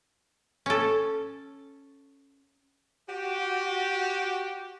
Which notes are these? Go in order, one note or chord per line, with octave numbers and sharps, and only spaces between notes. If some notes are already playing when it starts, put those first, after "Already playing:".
C#4 A4
F#4 G4